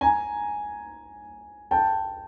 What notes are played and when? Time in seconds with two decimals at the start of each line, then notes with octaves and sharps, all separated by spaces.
0.01 G#5 A#5
1.71 G5 A5